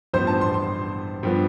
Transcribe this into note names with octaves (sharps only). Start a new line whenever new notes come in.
A1 G2 F3 B3 C5
A5
C6
C6
G2 F3 B3